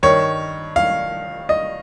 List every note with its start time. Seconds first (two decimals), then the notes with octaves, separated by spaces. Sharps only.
0.03 G2 D#3 C#5
0.76 F5
1.49 D#5